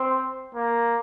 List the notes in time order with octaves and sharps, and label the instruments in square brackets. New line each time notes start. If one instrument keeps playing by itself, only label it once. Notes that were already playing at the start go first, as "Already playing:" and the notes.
Already playing: [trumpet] C4
A#3